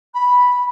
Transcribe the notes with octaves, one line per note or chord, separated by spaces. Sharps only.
B5